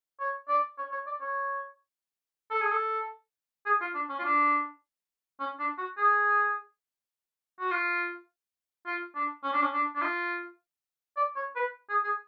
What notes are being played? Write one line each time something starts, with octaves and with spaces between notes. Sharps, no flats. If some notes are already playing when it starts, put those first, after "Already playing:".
C#5
D5
C#5
C#5
D5
C#5
A4
G#4
A4
G#4
F4
D4
C#4
F4
D4
C#4
D4
F#4
G#4
F#4
F4
F4
D4
C#4
D4
C#4
D4
D4
F4
D5
C#5
B4
G#4
G#4